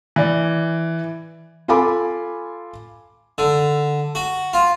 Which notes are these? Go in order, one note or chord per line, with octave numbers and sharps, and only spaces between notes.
E3 D5
F4 A4 G#5 B5 D6
D3
F#4
F4